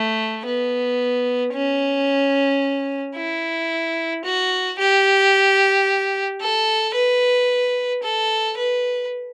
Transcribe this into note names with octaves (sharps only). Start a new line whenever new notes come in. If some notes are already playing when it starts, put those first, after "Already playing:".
Already playing: A3
B3
C#4
E4
F#4
G4
A4
B4
A4
B4